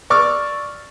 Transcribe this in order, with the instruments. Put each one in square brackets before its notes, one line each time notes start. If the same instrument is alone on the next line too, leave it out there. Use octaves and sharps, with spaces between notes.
[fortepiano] D5 C#6 D6 E6 F6